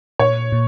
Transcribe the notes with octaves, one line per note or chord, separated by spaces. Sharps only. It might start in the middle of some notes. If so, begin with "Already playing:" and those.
A#2 C#5
A#2